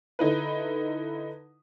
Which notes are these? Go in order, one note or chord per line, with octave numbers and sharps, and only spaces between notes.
D3 D#4 E4 B4